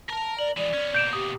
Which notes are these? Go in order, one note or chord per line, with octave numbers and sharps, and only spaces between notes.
A#4 A5 A#5
D5 F#7
E3 G#3 D5
B3 C#4
B2 A#3 G6 D7 E7
G4 D#6